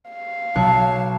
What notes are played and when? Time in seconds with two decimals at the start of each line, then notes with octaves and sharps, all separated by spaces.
0.10 F5
0.56 B1 C#5 A5 F#6